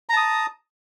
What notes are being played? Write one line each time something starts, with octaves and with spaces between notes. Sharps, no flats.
A5 A#5 D#6